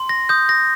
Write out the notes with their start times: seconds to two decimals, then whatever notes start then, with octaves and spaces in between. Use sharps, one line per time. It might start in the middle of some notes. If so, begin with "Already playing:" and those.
Already playing: C6
0.09 A#6
0.29 D#6 G6
0.49 A#6